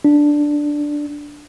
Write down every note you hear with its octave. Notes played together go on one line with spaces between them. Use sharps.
D4